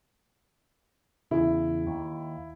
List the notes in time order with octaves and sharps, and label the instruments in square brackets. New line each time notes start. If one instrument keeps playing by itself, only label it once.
[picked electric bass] E2 C#3 [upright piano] E4
[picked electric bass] D#2